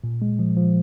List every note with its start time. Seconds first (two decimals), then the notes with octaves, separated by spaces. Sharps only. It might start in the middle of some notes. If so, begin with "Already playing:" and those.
0.04 A#2
0.22 G#3
0.39 F3
0.57 F3